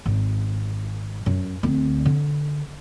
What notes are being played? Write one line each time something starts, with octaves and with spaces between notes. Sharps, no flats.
G#1
F#2
D2 C4
D3